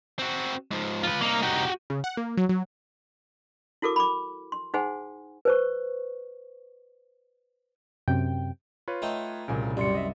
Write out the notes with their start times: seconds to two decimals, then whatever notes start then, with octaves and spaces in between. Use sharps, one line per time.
0.19 C4 F#4
0.71 G#2 F3
1.03 F4 B4
1.21 C2 A#3 D#4
1.43 F#4 G4
1.90 C#3
2.04 F#5
2.17 A#3
2.37 F#3
2.49 F#3
3.82 E4 F#4 A4 A#4 D6
3.96 B5 D6
4.52 C6
4.74 D#4 G#4 C5 F#5 G#5 C6
5.45 B4 C5 C#6
8.08 F#2 C3 G5
8.88 F4 B4 C#5
9.02 A3 D#4 G5
9.48 C2 A#2 C#3 G#5 D7
9.77 F#2 G3 C6 A6 C#7
9.95 D#5 E5